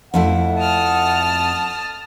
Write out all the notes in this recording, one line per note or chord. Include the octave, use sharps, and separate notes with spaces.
F2 A3 E4 F#5
A5 D#6 F6